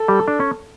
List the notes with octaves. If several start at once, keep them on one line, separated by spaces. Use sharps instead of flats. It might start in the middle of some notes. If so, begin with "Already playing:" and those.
Already playing: A4
G3
D4
C#4